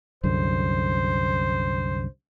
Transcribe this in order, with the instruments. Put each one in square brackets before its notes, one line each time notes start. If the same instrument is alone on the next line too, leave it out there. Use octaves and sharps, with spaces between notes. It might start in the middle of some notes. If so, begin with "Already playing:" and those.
[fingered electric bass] C2 F#2 D3 [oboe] C5